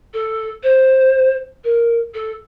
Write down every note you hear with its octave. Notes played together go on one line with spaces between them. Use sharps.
A4
C5
A#4
A4